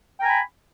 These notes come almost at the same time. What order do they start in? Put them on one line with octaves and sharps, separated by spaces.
G5 A#5 G#5 B5